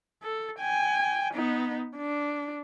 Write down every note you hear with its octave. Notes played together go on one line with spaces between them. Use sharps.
A4
G5 G#5
B3 D#4
D4